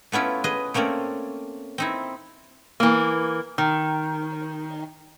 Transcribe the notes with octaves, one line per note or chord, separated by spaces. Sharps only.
A3 B3 C#4 E4 F4
G#4 B4 D#5
A3 A#3 C4 C#4 D5
C4 D#4 E4
E3 A#3
D#3